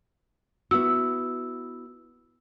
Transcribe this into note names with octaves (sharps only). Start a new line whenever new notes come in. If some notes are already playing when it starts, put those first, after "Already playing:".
B3 E4 F#4 E6